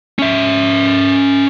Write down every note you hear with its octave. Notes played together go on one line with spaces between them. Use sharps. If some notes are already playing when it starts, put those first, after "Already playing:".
C#4 E5